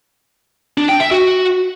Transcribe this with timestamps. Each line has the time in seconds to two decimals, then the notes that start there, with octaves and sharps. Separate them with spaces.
0.78 D4
0.89 G5
1.00 E5
1.11 F#4